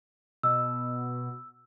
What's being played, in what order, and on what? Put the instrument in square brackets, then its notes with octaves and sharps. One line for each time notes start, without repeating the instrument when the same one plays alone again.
[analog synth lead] B2 [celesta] E6